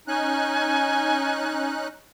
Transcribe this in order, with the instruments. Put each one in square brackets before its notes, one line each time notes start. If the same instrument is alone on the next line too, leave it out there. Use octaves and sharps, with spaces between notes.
[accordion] C#4 D#4 F#6 [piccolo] G#5